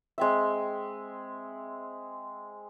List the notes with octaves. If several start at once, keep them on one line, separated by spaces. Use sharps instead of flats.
G#3 C4 E5